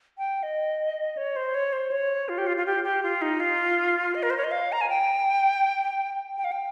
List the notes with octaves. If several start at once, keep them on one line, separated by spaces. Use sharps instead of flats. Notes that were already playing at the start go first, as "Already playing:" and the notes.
G5
D#5
C#5
C5
C#5
C5
C#5
F4
G4
F4
F4
G4
G4
F4
D#4
F4
D#5
A#4
C5
C#5
D#5
F5
A#5
G#5
G5
G5
F5
G5